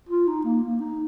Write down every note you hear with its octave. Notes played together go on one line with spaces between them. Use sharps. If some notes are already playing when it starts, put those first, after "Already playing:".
F4
D#4
A#3
A#3
D#4